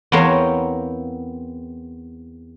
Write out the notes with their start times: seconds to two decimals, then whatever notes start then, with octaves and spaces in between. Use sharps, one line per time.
0.12 E2 B3 C4 A#4 C#5 F5